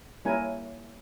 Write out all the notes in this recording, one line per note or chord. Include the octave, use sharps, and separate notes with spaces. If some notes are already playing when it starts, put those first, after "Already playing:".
G3 A#3 C#4 E4 A#4 G#5